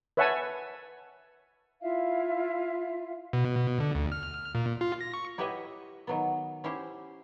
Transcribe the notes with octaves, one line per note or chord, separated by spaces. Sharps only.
B4 C#5 E5 F#5 G#5 A5
E4 F4 E5 F5
B2
D3
D2
F6
A#2
F4
A#6
C#6
E4 G4 B4 C#5 D#5 E5
D#3 F#3 B3
C#4 E4 G4 C5